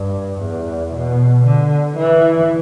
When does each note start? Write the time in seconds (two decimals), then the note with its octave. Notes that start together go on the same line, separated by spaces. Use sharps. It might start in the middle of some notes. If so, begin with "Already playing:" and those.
Already playing: G2
0.41 E2
0.93 B2
1.45 D3
1.97 E3